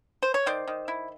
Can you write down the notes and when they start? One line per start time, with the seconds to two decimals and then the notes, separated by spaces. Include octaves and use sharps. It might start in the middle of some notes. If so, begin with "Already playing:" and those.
0.23 C5
0.34 C#5
0.46 D#3 C5 D5
0.68 D#3
0.88 E4